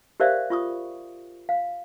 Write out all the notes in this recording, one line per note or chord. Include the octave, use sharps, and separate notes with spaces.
G4 A#4 C5 D5 E5 F5
F4 C#6 D#6
F5